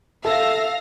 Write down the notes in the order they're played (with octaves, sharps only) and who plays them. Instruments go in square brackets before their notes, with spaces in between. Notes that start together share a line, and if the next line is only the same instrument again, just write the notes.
[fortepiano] A4 [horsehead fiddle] E5 [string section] F5 A#6